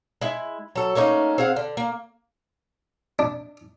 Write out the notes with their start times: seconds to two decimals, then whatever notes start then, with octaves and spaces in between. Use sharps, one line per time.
0.21 G#3 E4
0.76 F#3 A4
0.95 A3 A#3 C#4 D#4
1.38 C4 G#4 F5 F#5
1.56 D3
1.77 A#3
3.19 D4